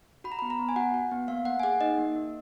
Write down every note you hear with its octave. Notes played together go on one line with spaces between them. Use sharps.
F#4 B5
A#5
B3 B5
A#5
B3
G#5
F#4 F#5
F#4
B3
A#3 F5
A#3 F#5
G#5
G#4 F#5
D#4 D#5
A#3
A#3